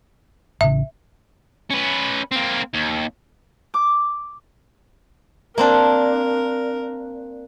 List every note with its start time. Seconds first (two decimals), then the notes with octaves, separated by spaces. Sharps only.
0.61 A1 C#3 E5
1.70 C#4 B4
2.31 A#3 C4
2.74 D#2
3.74 D6
5.58 A#3 C4 D4 A#4